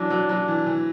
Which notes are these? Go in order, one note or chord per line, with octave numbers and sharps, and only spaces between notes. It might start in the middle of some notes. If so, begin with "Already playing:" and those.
Already playing: E3 F#3 D4
F#3
F#3
E3
E3